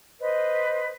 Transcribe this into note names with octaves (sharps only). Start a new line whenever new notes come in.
B4 C5 D#5